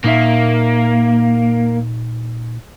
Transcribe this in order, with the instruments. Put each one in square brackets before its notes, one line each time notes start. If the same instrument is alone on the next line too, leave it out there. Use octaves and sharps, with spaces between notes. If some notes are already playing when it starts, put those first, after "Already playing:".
[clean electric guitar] A#2 D#4 E5 [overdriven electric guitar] A#3